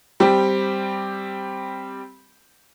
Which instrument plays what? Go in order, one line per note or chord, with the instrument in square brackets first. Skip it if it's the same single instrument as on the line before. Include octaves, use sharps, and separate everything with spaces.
[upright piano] G3 C4 G4